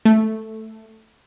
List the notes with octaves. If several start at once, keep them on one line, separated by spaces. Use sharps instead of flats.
A3